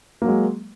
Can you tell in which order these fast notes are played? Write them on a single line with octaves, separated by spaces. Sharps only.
A#3 F#3 G#3